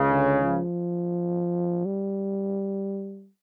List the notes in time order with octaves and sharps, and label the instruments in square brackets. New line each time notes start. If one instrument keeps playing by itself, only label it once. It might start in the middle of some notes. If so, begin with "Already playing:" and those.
Already playing: [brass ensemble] C#2 C#3
[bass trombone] D3
F3
G3